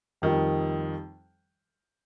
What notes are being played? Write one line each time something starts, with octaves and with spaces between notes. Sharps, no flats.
F2 D#3 G3